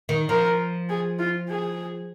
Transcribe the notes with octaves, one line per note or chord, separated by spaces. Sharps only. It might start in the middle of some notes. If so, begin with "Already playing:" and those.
D#3
F3 A#4
G#4
F4
G#4